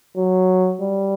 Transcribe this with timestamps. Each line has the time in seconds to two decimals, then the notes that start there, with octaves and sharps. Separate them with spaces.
0.17 F#3
0.81 G3